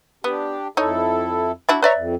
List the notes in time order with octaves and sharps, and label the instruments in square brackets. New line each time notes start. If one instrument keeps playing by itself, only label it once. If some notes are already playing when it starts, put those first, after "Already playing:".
[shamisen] B3 [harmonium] D4 G4
[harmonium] F2 E4 A4 [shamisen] D#4 C#5
[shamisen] D4 E4 F#4
[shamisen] B4 D5 E5 [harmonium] C#5 A#5
[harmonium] F2